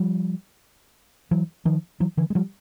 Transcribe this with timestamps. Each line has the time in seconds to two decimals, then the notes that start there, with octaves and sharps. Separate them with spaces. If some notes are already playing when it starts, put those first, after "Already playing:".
Already playing: F3 G3
1.31 E3 F#3
1.65 D#3 F3
2.00 E3 F#3
2.17 D3 E3
2.30 G#3
2.35 F3 G3